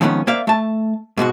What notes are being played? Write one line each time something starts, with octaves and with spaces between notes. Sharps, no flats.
F2 G#2 D#3 B3 C#4
A#3 C5 D5 E5 F5
A3 A5
G#2 B2 G#3 F#4